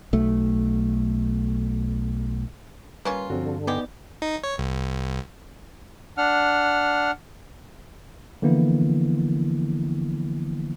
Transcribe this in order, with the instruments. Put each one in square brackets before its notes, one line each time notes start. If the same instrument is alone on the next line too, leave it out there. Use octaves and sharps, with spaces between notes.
[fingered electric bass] B1 A3
[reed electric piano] G3 B4 [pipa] A#3 C#4 F4
[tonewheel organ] G2 D3 [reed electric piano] F3 C4 F#4
[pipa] G#3 G4 [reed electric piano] B3 D#4 D5
[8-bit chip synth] D#4
C#5
C2
[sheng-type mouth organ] D4 F#5 F6
[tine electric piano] D3 E3 F3 A#3 B3 E4